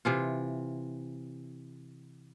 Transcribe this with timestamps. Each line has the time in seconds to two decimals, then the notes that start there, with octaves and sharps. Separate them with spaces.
0.05 C3 E3 F4